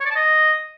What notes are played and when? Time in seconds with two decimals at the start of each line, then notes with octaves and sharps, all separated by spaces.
0.01 C#5
0.06 D5
0.11 A5
0.16 D#5